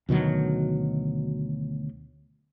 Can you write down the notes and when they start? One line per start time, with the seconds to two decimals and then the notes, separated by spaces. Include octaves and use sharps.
0.09 D2 B2 D#3 F#3